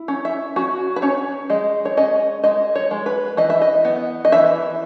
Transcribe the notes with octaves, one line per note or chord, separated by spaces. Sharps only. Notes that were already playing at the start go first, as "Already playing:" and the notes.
Already playing: E4
C#4
E5
C#4 F#4
B4
C#4 C#5
G#3 D#5
C#5
C#4 D#5
G#3 D#5
C#5
G#3
B4
E3 D#5
E5
D#5
B3
D#5
E3 E5